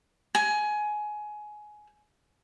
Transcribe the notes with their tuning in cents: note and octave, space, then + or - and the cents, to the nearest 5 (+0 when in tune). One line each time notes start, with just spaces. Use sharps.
G#5 +20